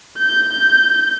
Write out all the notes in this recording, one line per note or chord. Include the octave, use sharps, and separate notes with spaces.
G6